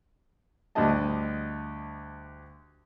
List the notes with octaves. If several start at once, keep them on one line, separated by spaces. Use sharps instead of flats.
D2 G3 D4 G4 D#5 A5